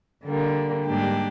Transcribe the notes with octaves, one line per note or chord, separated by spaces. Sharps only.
D3 G3 A#3
G#2 G3 A#3 D4 G4